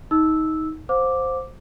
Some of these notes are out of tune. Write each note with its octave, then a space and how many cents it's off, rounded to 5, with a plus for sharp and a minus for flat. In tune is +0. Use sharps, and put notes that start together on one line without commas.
D#4 +20 E6 -10
C5 +0 F5 +45 D6 +0